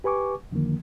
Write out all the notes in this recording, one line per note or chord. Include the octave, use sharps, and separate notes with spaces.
G4 B4 G#5 C#6 D6
F2 D3 D#3 F3 A#3